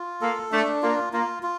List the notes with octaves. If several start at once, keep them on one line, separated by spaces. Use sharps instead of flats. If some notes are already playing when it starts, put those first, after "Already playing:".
Already playing: F4
A#3 A4
A3 D4
A#3 F4
A#3 F4
F4